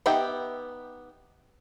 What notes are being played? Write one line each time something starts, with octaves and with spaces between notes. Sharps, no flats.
B3 D#4 G4 E5 G5